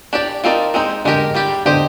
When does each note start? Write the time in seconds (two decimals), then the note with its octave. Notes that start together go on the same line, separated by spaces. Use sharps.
0.13 D4 G4 D5
0.44 F3 C4 D#4 A#4 D5
0.74 G#3 C4 D#4
1.05 D3 G#3 D4 G4 A#4
1.35 G3 D4 G4
1.65 D3 D4 G4 C5 D#5